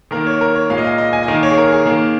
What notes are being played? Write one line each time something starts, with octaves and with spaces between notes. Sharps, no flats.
D#3 A#3 A#4
C#5
A#4
C#5
A#2 G#3 F5
D#5
F5
D#5
G#5
D#5
D#3 A#3 F5
C#5
G#4
A#4
G#4
D#3 A#3